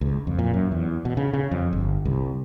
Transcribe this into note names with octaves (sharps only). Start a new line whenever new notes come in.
C#2
F2
A#2
F#2
E2
B2
C#3
C#3
F2
G1
C2